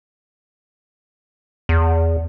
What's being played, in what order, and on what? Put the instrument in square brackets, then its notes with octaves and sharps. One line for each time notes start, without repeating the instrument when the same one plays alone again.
[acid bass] E2